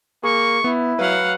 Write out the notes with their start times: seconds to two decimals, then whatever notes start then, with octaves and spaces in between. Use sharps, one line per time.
0.24 A#3 G#4 C#6
0.64 B3 E4
0.99 F#3 B4 F5 F#5